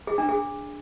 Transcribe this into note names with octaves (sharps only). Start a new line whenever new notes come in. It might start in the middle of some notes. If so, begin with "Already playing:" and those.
G#4
D4
G#4